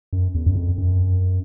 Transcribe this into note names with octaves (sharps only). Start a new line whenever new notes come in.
F#2
E2
F#2
F2
F#2